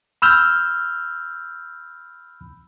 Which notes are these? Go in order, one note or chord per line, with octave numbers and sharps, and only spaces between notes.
B5 E6 F6 G6